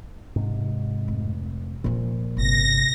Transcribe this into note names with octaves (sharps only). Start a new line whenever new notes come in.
G#2 C3
F1
A#2 F3 F4
G1 C3 A#6